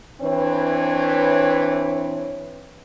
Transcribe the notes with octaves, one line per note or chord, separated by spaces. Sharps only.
E3 C4 D4 B4 C#5